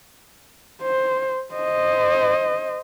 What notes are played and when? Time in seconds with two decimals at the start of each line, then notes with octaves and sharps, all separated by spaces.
0.83 C5
1.54 C5 D#5